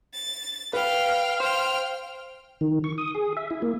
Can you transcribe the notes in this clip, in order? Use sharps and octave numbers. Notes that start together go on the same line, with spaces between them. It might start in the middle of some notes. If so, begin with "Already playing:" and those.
A6
B4 F5 G5 F6
C5 G5 F6
D#3
C#6
D#6
G#4
E5
E4
A#3